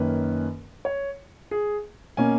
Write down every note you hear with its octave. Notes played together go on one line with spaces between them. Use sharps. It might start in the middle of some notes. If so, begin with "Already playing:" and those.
Already playing: F#2 D#3 A#3 C#4 B4
C#5
G#4
B2 A#3 C#4 G#5